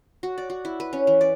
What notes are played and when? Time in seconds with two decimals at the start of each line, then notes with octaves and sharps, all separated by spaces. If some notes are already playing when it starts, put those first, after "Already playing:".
0.23 F#4
0.38 D5
0.50 F#4
0.65 E4
0.80 B4
0.93 C#4
1.07 E3
1.21 D5